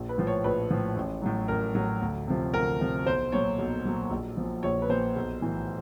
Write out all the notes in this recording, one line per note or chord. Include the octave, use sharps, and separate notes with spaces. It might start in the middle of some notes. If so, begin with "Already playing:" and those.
Already playing: A#1
B4
A2 F3
C#5
A#1 B4
A2 F3
A1
A2 F#3
A1 A#4
A2 F#3
D2
C3 F3
D2 A#4
C3 F3
B1 C5
A#2 F#3 C#5
B1
A#2 F#3
A#1
A#2 F3
A#1 C#5
B4
A#2 F3 C5
B1
A2 E3